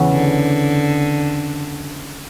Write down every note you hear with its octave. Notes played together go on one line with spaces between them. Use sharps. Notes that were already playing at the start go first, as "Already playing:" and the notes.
Already playing: E2 C#3 E3 B3
D3